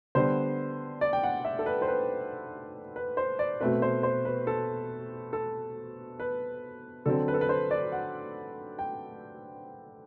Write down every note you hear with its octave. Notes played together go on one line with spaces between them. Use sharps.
D3 G3 B3 C5
D5
G5
F#5
E5
A4
B4
C5
B4
B4
C5
D5
B2 A3 C4 B4
C5
C5
B4
A4
A4
B4
D3 F#3 C4 A4
B4
A4
B4
C5
D5
F#5
G5